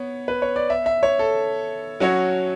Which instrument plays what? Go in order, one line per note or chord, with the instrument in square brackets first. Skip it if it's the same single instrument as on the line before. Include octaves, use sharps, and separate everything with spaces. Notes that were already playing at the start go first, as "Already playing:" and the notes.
Already playing: [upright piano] B3 [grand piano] C#5
[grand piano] B4
C#5
D5
E5
E5
C#5
A4
[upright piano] F#3 C#4 F#4 C#5